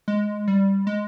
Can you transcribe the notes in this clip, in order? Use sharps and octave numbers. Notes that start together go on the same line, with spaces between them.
G#3
G3
G#3